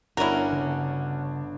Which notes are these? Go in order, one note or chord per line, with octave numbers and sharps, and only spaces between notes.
G1 B3 C#4 D4 E4 F#4 A#4
C#3